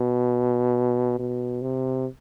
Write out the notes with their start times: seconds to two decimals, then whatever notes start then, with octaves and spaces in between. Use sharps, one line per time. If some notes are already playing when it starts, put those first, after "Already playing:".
Already playing: B2
1.19 B2
1.62 C3